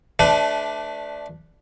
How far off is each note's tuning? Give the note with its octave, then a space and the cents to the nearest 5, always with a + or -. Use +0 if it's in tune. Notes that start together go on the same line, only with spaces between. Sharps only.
A3 -15 D4 +0 B4 +40